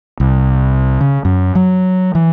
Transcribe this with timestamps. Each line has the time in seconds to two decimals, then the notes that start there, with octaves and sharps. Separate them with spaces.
0.20 C2
1.01 C#3
1.25 F#2
1.55 F#3
2.15 E3